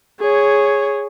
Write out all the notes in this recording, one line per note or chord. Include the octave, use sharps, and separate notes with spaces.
G#4 C#5